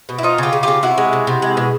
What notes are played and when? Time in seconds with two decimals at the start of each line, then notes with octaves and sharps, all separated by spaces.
0.09 B2
0.18 E4
0.23 F3 D#4 F4
0.38 C#3 F4 G4
0.53 C#3
0.63 C#3 F4 G4
0.83 C3 E4 F#4
0.98 G#3
1.13 C3
1.27 C3
1.42 G#3
1.57 B2